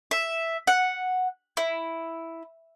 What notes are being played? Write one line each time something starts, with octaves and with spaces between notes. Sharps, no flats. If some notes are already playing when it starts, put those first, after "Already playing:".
E5
F#5
E4